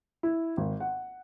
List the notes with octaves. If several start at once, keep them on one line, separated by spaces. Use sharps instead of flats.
E4
G#1
F#5